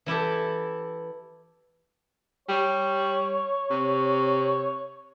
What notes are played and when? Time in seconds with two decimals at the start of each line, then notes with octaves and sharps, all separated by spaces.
0.06 E3 E4 G4 A4
2.49 G3 C#5
3.70 C3